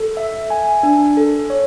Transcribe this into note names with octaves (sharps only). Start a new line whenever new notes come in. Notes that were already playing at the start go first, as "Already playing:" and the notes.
Already playing: A4
E5
G#5
D4
A4
C#5